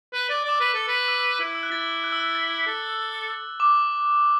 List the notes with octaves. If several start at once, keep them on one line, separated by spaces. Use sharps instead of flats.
B4 F#6
D5 A6
D5 D6
E6
B4
A4 D6
B4
E6
E4 E6
E6
F#6
E4 A6
F#6
E6
F#6
A6
A4
D6